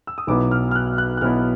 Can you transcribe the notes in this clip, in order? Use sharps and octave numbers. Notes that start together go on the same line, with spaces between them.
E6
D#6
B1 B2 F#3 B3 E4 D6
F6
F6
F#6
F6
F#6
F#6
B1 B2 F#3 B3 E4 F6